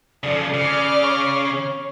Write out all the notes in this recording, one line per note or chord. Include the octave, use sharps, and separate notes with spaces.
C#3 F3 A4 D5
C#3 D6 F6
C#5 C#6